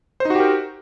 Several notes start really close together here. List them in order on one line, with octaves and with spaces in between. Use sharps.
C5 D#4 F#4 G4 A#4